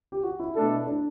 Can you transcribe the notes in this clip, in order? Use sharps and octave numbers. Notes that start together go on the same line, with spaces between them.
G4
F#4
E4
B2 A3 D4 A4
D4